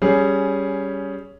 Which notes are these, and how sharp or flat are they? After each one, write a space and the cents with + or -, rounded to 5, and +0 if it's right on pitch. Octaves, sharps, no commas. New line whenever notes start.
G3 +0 C#4 +10 G#4 +5